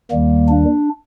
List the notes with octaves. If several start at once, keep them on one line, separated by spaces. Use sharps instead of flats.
D#2 D#3 G3 A#3
D4